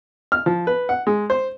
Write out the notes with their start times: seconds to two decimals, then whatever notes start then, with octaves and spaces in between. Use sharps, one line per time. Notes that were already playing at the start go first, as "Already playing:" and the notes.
0.32 F6
0.46 F3
0.67 B4
0.89 F#5
1.07 G#3
1.30 C5